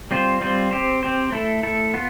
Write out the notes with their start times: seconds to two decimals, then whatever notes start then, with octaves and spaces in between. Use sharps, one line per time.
0.11 G3 C4 F4 C5
0.41 G3 C4 F4 C5
0.71 C4 G4 C5
1.03 C4 G4 C5
1.32 A3 E4 A4
1.63 A3 E4 A4
1.94 B3 F4